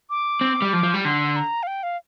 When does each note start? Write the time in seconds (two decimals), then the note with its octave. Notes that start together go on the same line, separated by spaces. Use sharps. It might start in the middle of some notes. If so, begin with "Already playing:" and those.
0.10 D6
0.41 C4
0.62 G3
0.73 F3
0.83 F3
0.94 G3
1.05 D3 C6
1.36 A#5
1.63 F5
1.67 G5
1.83 F5